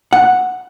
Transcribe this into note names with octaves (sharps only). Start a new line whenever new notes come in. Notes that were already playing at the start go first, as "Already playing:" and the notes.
F#5